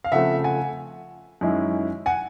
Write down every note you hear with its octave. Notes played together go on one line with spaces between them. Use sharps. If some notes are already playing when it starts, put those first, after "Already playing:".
F5
C#3 F3 A3 C4 E5 F#5
F#5 G#5
F#2 D#3 G#3 C#4 E4
F#5 G#5